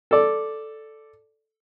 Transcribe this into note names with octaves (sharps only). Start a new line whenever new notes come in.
A4 D5